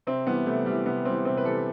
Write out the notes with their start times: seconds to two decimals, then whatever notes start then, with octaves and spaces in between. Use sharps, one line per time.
0.07 C3 C4
0.27 E3 G3 B3
0.46 C3 A3
0.66 E3 G3
0.86 C3 B3
1.05 E3 G3 C4
1.25 C3 C4
1.37 B4
1.45 E3 G3 A4